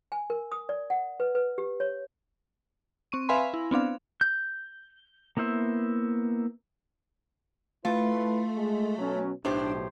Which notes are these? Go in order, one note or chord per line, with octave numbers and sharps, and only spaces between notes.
G#5
A#4
D#6
D5
F#5
B4
B4
G4
C#5
C4 C#6 D#7
B4 E5 F5 G#5 B5 C6
E4
B3 C4 D4 F5
G6
A#3 B3 E4 C5 E5
A3 E4 F4 B4
G#3
B2 F#3 C#4
B1 A2 D4 G4 C5